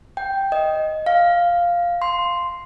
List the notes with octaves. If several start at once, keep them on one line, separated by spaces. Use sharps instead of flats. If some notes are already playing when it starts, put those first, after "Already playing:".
G5
D#5
F5
C6